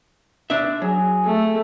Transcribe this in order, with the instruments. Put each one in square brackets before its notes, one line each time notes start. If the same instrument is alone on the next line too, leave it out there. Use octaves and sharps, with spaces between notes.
[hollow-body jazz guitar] D4 E5
[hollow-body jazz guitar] F#3 [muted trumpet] G#4
[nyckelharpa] A3